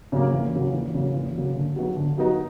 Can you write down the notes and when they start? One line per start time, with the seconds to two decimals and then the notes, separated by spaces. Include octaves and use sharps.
0.12 C#3 F#3 A#3
0.33 E2
0.53 C#3 F#3 A#3
0.74 E2
0.94 C#3 F#3 A#3
1.15 E2
1.35 C#3 F#3 A#3
1.56 D3
1.76 F#3 B3 D#4 F#4
1.97 D3
2.18 F#3 B3 D#4 F#4